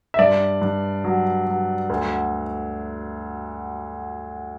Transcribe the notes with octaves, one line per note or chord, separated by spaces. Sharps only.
E5
G2 D5
G2
F#3
F#3
D2